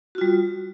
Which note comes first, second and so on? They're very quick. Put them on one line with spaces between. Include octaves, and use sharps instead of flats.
F#4 F4 G3